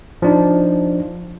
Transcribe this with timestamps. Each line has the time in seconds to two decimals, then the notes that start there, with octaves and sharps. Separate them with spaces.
0.22 F3 D4 D#4